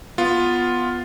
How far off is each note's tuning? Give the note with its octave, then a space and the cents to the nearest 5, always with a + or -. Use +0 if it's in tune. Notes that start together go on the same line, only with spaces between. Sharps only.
B3 +0 F4 +5